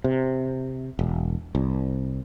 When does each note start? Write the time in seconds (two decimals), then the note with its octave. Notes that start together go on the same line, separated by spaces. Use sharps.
0.04 C3
0.99 E1
1.55 C2